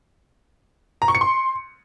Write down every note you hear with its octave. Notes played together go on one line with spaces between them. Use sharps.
A#5
C#6
C#7
C6